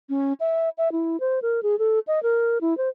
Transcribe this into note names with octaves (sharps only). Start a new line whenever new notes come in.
C#4
E5
E5
E4
C5
A#4
G#4
A4
D#5
A#4
E4
C5